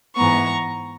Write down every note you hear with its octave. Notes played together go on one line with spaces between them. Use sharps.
G#2 E3 G#3 B3 A#5 C#6